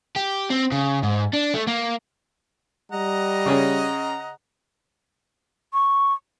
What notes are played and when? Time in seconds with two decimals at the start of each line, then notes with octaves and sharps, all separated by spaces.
0.16 G4
0.50 C4
0.72 C#3
1.03 G#2
1.33 D4
1.54 A3
1.67 A#3
2.92 G3 D#5 F#5 A#5
3.46 C#3 C#4 G#4
5.73 C#6